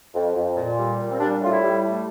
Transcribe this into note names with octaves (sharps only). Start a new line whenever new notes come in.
F2
F2
A#2
G3
A#2
C4
G3 D4
A2 F4
E4
G3
A3